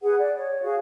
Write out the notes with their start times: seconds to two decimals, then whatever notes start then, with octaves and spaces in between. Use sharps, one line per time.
0.02 G#4 B4 F#5
0.18 D5
0.38 C#5
0.62 F#4 G#4 F5